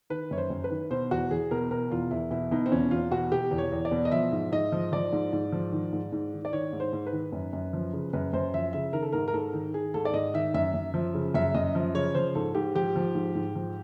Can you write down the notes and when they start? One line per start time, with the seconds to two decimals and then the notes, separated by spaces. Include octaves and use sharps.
0.10 D#3 B4
0.31 F#2 C#5
0.38 C5
0.50 F#2
0.64 B4
0.71 D#3
0.91 B2 C5
1.11 E2 F#4
1.30 E2 G#4
1.51 B2 A#4
1.71 B2 A#4
1.90 E2 F4
2.11 E2 E4
2.31 B2 E4
2.51 B2 D#4
2.66 C4
2.72 E2 C#4
2.91 E2 F4
3.11 B2 F#4
3.32 B2 G4
3.51 E2
3.58 C#5
3.72 E2
3.85 D5
3.91 B2
4.05 D#5
4.12 F3 E5
4.32 G#2
4.52 G#2 D#5
4.72 F3
4.92 F3 D5
5.13 G#2
5.33 G#2
5.52 F3
5.72 D#3
5.93 G#2
6.12 G#2
6.33 D#3
6.45 D5
6.53 D#3 C#5
6.73 G#2
6.80 C5
6.93 G#2
7.07 B4
7.12 D#3
7.33 F#2
7.53 F#2
7.73 F3
7.93 C#3
8.13 F#2 B4
8.33 F#2 C5
8.54 F3 E5
8.73 C#3 E5
8.93 D#3 A#4
9.02 A4
9.12 G#2 A#4
9.28 A#4
9.34 G#2 A4
9.53 D#3
9.74 D#3 G#4
9.94 G#2 A4
10.05 D5
10.14 G#2 D#5
10.34 D#3 E5
10.54 F#2 E5
10.74 F#2
10.94 F3
11.14 C#3
11.34 F#2 E5
11.54 F#2 D#5
11.75 F3
11.94 C#3 C#5
12.14 F3 C5
12.35 G#2 A4
12.55 G#2 G4
12.75 F3 G4
12.96 F3
13.15 G#2
13.35 G#2
13.55 F3